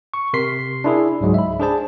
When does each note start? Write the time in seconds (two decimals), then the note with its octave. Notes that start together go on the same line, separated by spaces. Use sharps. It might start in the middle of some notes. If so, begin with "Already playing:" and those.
0.14 C#6
0.33 C3 A#4 C6 B6 C7
0.84 D4 E4 G#4
1.21 C#2 G#2 F#3 G#3
1.34 E5 B5
1.60 D4 G#4 C5 A5